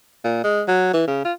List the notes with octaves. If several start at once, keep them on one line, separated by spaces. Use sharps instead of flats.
A#2
G#3
F#3
E3
C#3
F4